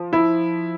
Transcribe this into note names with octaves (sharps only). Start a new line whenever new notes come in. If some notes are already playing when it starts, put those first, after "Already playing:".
Already playing: F3
E4